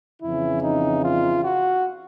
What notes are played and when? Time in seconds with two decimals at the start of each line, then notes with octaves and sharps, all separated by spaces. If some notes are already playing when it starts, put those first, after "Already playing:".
0.22 F2 C#3 E3 E4
0.63 D#4
1.04 F4
1.44 F#4